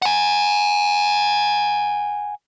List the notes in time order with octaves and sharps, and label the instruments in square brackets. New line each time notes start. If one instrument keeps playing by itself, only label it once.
[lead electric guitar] F#5 G#5